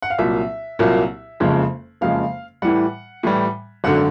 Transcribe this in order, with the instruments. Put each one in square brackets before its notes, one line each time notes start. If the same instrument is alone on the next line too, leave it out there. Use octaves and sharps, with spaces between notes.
[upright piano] F#5
F5
C2 A#2 F#3 A#3 E5
C2 A#2 F#3 A#3
F#1 F2 C#3 F3 G#3
F#1 F2 C#3 F3 G#3 F5
A2 E3 G3 F#5
A2 E3 G3
G#1 F#2 D3 F#5